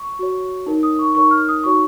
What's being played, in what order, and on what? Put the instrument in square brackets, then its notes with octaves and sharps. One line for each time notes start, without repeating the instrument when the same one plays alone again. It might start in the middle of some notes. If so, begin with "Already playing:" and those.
Already playing: [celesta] C#6
F#4 C#5
D#4 A#4 C#5
D#6
C#6
D#4 A#4 C#5 C#6
F6
D#6
D#4 F#4 C#5 C#6